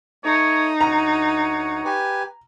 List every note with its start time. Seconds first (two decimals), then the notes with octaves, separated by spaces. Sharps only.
0.24 A3 D#4 C#5
0.81 D2 C#5 F#5 A#5
1.84 G4 B4 G#5